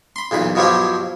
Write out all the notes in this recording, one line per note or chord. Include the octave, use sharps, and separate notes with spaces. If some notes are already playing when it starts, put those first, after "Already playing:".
B5 C6
B1 E2 A#2 B5
G2 B2 F3 F#3 E4 G4